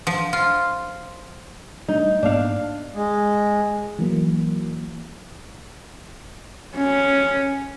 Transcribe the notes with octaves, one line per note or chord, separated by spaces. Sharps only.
F3
F4
G3 A3 D4 D#4
G#2 A#3 B3 D4 F5
G#3
E3 F#3 A#3
C#4